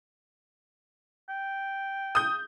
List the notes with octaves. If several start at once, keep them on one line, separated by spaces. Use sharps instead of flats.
G5
D#6 G6